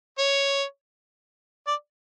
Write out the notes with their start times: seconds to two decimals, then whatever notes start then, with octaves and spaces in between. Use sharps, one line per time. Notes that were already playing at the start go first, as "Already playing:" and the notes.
0.18 C#5
1.67 D5